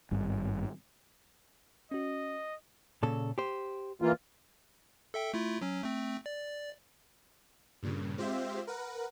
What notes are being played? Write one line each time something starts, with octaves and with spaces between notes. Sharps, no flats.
G#1 G2
C#4 F#4 D#5
A#2 C#3 A4
G4 C5
E3 A#3 F4
A4 E5 G5
A3 E4 F4
F#3 C#4
A3 C4
D5
G2 A#2 C#3
G#3 C4 F4 G4 C5 E5
A#4 B4 F#5